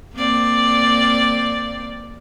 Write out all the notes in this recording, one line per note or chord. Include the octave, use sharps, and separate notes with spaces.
A#3 C4 D5